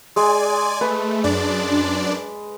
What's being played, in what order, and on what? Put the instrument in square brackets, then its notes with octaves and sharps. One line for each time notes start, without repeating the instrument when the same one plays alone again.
[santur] G#3 [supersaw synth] D5 G#5
[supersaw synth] A3 [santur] B4
[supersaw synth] F#2 D4 D5